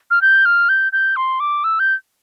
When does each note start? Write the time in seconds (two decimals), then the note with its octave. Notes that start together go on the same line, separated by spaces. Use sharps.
0.11 F6
0.22 G6
0.45 F6
0.69 G6
0.92 G6
1.16 C6
1.40 D6
1.64 E6
1.79 G6